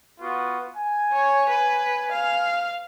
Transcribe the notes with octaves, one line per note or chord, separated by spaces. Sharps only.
B3 F4 F#4
G#5
C#5
B4
F5